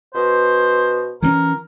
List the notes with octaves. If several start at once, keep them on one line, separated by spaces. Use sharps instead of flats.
B2 C5
E3 C4 C#4 A#4